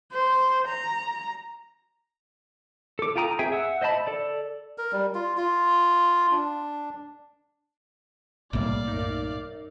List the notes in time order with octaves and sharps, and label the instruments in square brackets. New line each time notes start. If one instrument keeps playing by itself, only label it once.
[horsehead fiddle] C5
A#5
[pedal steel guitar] A4 D6
F4 A4 G5 A#5 D#6
C4 G#4 E5 G5 G#5
E5 F#5 E6
C5 D#5 E5 A5 B5
A4 D5
[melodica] A#4
G3
F4
F4
D4
[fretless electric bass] B1 A2 A#3 [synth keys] C3 G3 [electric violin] D5 F5
[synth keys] F#2 D#4